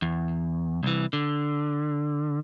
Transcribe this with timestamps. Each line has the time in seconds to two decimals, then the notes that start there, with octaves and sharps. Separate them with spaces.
0.02 E2
0.83 C2 E3
1.13 D3